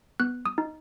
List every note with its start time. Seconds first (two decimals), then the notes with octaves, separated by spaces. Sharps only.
0.20 B3 F#6
0.46 D#6
0.58 D#4